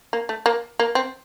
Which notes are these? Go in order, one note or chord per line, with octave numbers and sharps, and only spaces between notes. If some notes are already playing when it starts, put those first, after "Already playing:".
A#3
A3
A#3
A#3
C4